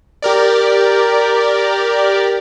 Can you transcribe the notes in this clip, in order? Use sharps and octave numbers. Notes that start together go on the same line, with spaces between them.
G4 A#4 D5